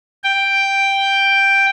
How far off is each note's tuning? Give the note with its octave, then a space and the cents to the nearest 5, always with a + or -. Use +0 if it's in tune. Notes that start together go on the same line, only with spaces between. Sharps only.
G5 +5